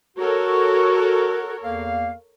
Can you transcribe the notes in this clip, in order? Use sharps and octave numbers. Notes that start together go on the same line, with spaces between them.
F#4 A4 A#4 C#5
E2 A#3 F5